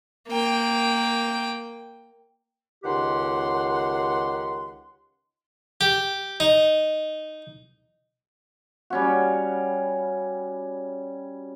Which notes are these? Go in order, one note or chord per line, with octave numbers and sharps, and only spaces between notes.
A#3 G5
C#2 D#3 G4 F#5 C6
G4
D#4
G3 C#4 F#4